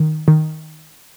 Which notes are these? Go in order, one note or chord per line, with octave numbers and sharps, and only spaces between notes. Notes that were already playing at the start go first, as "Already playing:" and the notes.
Already playing: D#3
D#3